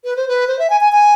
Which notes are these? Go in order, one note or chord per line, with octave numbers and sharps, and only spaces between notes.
B4
C5
B4
C5
E5
G#5
G#5
G#5